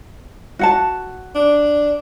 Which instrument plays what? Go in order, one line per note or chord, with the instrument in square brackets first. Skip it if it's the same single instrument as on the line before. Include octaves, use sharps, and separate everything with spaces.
[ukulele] F#4 F#5 A5
[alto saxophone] D4